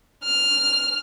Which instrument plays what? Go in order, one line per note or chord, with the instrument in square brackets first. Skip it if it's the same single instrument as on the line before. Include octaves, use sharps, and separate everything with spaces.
[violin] F6